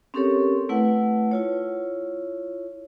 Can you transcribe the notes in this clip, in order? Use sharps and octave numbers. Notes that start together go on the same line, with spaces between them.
C4 C#4 G4 A4 A#4 C#5
A3 E4 B4 F#5
E4 F4 C#5